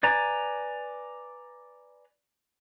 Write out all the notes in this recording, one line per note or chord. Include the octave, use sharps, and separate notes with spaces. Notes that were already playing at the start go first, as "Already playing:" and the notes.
B4 D5 G#5 A#5